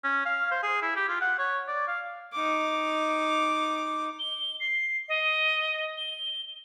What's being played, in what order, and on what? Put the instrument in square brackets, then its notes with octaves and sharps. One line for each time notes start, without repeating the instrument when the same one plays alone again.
[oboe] C#4
F5
C5
G#4
E4
G4
F4
F#5
C#5
D5
F5
[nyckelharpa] D#4 D6
[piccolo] G7
C7
D#5
G7